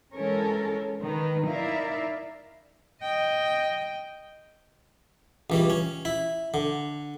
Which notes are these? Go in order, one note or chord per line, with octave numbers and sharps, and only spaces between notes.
E3 G#3 C#4 A4 A#4 C#5
D#3 B4
D#4 E4 A#4 D5 E5 F5
D#5 G5
C#2 E3 G3
C#4
E4
D3